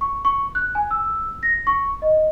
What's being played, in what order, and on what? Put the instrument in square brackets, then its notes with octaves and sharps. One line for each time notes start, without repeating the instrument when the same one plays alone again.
[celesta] C#6
C#6
F#6
G#5
E6
A#6
C#6
D#5